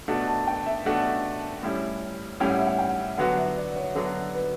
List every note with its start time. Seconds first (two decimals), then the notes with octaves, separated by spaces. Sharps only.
0.08 B2 A3 D4 F#4 A5
0.27 A5
0.38 A5
0.47 G5
0.66 E5
0.85 B2 A3 D4 F#4
1.63 A2 G3 C#4 E4
2.40 A2 G3 C#4 E4 G5
2.49 F#5
2.58 E5
2.66 F#5
2.79 G5
3.18 D3 F#3 B3 F#4 F#5
3.37 E5
3.56 D5
3.76 C#5
3.95 D3 F#3 B3 F#4 A4
4.35 B4